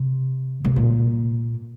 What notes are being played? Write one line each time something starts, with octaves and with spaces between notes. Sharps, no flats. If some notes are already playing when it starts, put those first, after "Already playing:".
Already playing: C3
C3
A#2